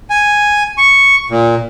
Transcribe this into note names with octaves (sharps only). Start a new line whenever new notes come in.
G#5
C#6
A#2